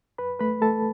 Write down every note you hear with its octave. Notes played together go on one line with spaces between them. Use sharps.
F#2 B4 B5
A3 B4 B5
A3 A4 A5